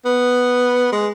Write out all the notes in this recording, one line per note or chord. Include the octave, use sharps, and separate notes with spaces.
B3
G#3